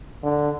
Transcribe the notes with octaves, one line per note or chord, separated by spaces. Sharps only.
D3